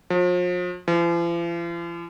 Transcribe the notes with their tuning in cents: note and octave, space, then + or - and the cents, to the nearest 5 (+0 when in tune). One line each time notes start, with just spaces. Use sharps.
F3 +40
F3 -45